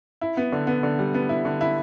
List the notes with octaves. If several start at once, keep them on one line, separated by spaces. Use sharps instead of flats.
E4
B3
D3
B3
D3
G3
B3
E4
D3
E4